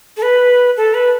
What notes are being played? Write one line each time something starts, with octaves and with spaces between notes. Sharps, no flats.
A4
B4
A4
B4